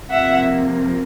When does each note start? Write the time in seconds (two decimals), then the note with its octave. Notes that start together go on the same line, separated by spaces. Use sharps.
0.11 F2 C3 F3 A#3 E5 F#5